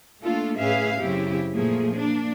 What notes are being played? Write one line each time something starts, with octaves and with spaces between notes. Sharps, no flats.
A3 A#3 D4 F4 A4
A2 C#4 G#4 B4 E5 F5
F#2 C#3 C4 E4 G4
A#2 F3 A3 A#3 G#4
A#3 D4